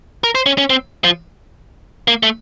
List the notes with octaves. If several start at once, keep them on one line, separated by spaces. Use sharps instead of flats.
A#4
C5
C#4
C#4
C4
F3
A#3
A3